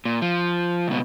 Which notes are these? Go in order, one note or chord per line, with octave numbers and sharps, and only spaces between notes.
A#2
F3
C#2 B2